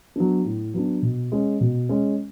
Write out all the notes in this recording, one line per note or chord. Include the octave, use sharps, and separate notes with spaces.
F#3 B3 D4
A2
F#3 B3 D4
B2
G#3 C#4
B2
G#3 C#4